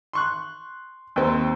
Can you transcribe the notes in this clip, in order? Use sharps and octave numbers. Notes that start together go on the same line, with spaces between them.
C6 C#6 F#6
D#2 C4